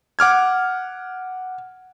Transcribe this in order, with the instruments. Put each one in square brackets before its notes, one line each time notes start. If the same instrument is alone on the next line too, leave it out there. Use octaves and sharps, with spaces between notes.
[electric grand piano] F#5 D6 F6 G#6